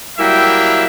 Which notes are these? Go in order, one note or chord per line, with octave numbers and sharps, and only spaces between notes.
F#3 G3 A#3 E4 E5 G5